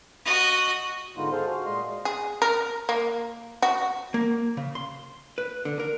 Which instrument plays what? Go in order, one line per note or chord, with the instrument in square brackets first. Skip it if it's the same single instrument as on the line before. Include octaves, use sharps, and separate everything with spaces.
[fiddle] F#4 D#5
[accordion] G#2 D3 G#3 B3 D#4 F4
G#4 A4 C5 F5
F#4 F5
A#2 G#3 D#5 C6
[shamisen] G#4
A#4
A#3
F#4
[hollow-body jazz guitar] A#3
C#3
C6
B4
D3
A#4